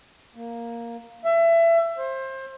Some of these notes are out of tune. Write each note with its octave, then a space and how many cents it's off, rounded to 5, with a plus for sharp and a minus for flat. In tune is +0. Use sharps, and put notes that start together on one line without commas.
A#3 +0
E5 +25
C5 +25